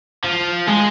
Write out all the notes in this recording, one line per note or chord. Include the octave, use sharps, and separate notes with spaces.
F3
G#3